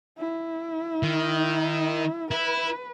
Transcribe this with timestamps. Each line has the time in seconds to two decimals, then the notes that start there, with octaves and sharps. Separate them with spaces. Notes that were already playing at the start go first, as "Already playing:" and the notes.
0.18 E4
1.03 D#3
2.31 E4 B4